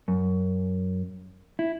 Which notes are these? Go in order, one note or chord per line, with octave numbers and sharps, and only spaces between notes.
F#2
E4